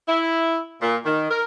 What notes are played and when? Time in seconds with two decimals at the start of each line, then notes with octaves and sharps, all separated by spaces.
0.08 E4
0.82 A#2
1.05 D#3
1.30 A#4